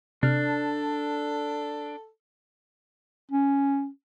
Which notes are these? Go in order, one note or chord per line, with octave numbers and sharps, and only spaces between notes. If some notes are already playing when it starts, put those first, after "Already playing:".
C3 D4 A4 F6
C#4